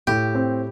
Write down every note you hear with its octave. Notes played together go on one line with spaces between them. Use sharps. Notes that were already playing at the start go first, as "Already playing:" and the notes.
A2 G4
C4